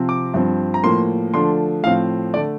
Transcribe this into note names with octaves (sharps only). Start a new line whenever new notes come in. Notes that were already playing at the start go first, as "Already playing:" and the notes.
Already playing: C3 F3 C4
D6
G2 F3 C4
A#5
A2 F3 A#3 C6
D3 F3 A3 D4 C6
A2 F3 C4 F5
D3 A3 D5